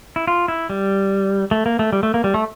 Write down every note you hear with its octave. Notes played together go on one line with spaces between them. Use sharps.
E4
F4
E4
G3
A3
A#3
A3
G3
A3
A#3
G3
A3